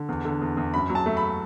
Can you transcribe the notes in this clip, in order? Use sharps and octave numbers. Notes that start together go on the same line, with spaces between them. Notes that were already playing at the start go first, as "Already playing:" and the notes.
Already playing: D3
E2
D3
E2
E2
F#2 B5
F#3
A5
A3
B5